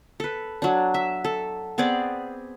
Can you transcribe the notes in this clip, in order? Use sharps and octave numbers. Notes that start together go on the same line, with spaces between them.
A4 B4
F#3 D4
E5
A4
B3 C4 G#4 D5